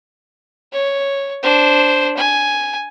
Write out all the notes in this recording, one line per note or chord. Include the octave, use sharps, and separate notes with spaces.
C#5
D4 C5
G#5